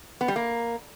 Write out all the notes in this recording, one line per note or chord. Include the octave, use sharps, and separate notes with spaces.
B3
G3
A#3